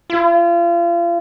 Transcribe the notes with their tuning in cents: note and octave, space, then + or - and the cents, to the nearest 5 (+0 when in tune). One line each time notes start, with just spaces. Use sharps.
F4 -35